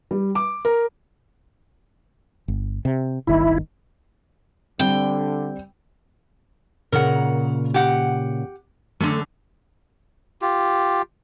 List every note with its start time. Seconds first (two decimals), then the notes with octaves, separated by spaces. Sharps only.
0.11 G3
0.35 D6
0.65 A#4
2.48 G1
2.85 C3
3.27 D1 G1 D#3 E4
4.79 D3 G3 C4 G5
6.92 A#2 C#3 A#4 F#5
7.74 G4 F#5
9.00 F#2 D3 A3 A4
10.42 F4 G4